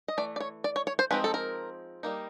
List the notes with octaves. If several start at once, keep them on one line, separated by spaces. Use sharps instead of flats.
D#5
E3 A3 D5
D5
C#5
D5
C#5
C#5
C5
F3 G#3 C4 D#4 B4
A4
A#4
G3 A#3 D#4